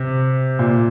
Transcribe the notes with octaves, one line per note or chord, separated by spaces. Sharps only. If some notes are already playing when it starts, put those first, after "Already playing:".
Already playing: C3
A#2